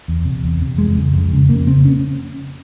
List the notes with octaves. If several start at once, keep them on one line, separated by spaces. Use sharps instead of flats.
E2
C3
E2
C3
F2 G#3
C#3
F2
C#3
F2 A#3
C#3 C4
C#4